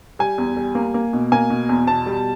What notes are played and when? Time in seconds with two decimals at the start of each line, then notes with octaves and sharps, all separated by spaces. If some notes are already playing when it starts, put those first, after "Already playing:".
0.19 G3 G#5
0.38 E2
0.57 G3
0.75 A#3
0.94 A#3
1.13 B2
1.32 A#3 G#5
1.50 B2
1.69 E2
1.87 B2 A5
2.06 G3